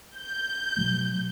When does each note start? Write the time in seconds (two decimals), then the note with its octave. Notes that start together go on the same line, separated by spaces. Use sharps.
0.15 G6
0.77 B2 F#3 A3